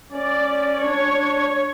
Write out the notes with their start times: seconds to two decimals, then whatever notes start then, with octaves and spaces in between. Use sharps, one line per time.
0.12 C#4 D5
0.83 D4 C#5